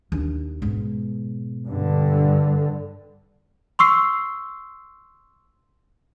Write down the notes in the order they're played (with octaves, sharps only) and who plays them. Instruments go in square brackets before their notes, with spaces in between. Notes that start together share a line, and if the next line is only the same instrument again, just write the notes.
[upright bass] D#2 D4
G#2 B2
[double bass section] G2 D3
[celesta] C6 C#6 E6 C7